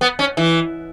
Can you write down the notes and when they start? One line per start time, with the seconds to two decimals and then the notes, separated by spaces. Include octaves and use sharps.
0.01 B3
0.19 C#4
0.37 E3